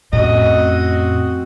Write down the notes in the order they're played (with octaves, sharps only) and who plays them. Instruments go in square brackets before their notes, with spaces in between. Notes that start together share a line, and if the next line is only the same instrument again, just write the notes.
[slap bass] F2 C#4 [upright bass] A2 [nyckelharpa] C4 F#4 [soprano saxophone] D#5